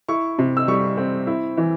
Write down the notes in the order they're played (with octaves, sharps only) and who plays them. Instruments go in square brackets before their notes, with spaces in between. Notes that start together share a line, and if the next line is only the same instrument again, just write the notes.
[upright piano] E4 C#6
C3
E6
G3 C#6
C4
E4
E3